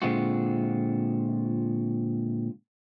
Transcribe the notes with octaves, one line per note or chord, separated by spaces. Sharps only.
A#2 D3 G#3 C4 F4 F#4